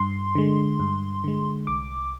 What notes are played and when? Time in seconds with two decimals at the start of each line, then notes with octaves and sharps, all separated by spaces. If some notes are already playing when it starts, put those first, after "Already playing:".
Already playing: G2 C6
0.35 D3 G#3
0.80 G2
1.24 D3 G#3
1.67 C2 D6